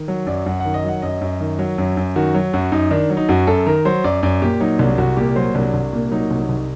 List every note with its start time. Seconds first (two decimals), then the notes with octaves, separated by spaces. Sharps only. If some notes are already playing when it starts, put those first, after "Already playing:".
Already playing: D#3
0.08 F#3
0.26 F#2 D5
0.46 F#2 F#5
0.60 F#5
0.65 D#3
0.74 D#5
0.84 F#3 F#5
1.02 F#2 D#5
1.21 F#2
1.40 D#3
1.59 F#3
1.78 F#2
1.97 F#2
2.16 D#3 F#4
2.35 F#3
2.53 F#2 F#4
2.72 F#2 D#4
2.91 D#3 D4
3.10 F#3
3.17 D#4
3.29 F#2 F#4
3.47 F#2 A4
3.66 D#3 A#4
3.85 F#3 C5
4.04 F#2 D5
4.23 F#2 D5
4.42 A#2 G4
4.60 F#3 D#4
4.79 C2 D4
4.98 C2 F#4
5.17 A#2 G4
5.36 F#3 C5
5.54 C2 D4
5.74 C2
5.93 A#2
6.12 F#3 D#4
6.31 C2
6.49 C2